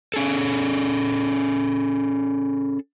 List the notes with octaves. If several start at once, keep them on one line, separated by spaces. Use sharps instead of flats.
C#4 G#4 A4